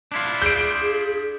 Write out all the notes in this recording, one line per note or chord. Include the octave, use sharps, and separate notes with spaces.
D4 E4 F4
G#4 G6 D7